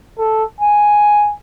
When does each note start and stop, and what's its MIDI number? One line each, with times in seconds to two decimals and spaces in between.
0.19 0.44 69
0.61 1.33 80